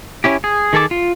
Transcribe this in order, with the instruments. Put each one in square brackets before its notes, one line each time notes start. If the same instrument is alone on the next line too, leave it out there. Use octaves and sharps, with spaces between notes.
[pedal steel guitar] C#4 E4 G4
G#4
D#3 G#4 A4 A5 D6
F4